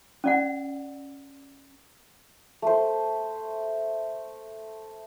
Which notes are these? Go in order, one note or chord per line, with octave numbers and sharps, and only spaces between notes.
C#4 D5 F#5
A3 C5